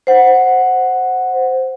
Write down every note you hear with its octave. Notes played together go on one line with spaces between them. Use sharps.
C5 F#5